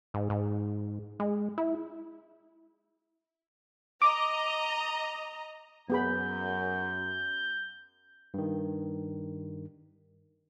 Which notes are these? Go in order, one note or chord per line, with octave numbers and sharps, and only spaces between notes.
G#2
G#2
G#3
E4
D#5 A#5 D6
F#2 B3 G#4 B5 G6
G2 D#3